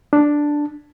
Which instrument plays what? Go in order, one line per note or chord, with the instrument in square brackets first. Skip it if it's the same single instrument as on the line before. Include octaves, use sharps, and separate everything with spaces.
[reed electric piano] D4